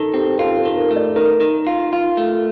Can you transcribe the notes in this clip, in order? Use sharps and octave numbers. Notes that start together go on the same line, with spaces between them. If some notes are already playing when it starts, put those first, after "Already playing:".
Already playing: D#3 A4
C4 G4
F4 A4
A4
D#3
A#4
A3
D5
D#3 A#4
D#3
F4
F4
A3